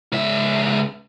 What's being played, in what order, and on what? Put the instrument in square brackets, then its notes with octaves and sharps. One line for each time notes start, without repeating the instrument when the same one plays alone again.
[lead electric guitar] C#2 E5